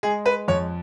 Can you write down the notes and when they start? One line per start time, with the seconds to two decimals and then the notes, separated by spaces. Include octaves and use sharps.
0.03 G#3 G#4
0.26 B4
0.48 F2 C#5